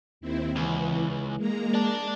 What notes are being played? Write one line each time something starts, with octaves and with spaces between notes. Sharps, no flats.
D#2 C4 E4
C#2 E3
G#3 A#3 A#5
D5 A5